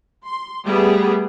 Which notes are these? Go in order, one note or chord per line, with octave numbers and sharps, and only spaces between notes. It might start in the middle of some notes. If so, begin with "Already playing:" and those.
C6
G3 A3 B3 G#4